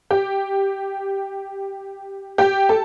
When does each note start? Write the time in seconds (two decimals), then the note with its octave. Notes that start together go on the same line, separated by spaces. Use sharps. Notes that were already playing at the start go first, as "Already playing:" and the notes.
0.11 G4 G5
2.38 G4 G5
2.69 A4 A5